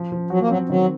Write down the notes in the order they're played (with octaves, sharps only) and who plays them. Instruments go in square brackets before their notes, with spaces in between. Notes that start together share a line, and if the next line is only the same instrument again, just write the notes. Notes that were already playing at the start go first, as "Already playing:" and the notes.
Already playing: [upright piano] F3
F3
[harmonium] F#3 [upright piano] F#4
[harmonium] A#3
[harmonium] F#3 [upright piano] C4
[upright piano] D#3 [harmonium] F#3